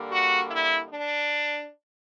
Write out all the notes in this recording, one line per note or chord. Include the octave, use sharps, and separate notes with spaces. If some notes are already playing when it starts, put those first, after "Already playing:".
Already playing: D3 G3 A#3
F#4
E4
D4